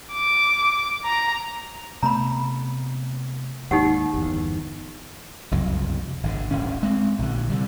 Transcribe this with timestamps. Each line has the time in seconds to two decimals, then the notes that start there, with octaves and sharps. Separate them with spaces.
0.13 D6
1.05 A#5
2.03 C3 A3 B3 A#5 B5
3.71 D#2 G#2 D#4 G4 F#5
4.14 G1 E2
5.51 F#1 C2 F2 F#3
6.23 G#1 D3
6.51 D1 G#1 C#4
6.83 G#3 C4
7.19 A#1 D3
7.49 C3 G3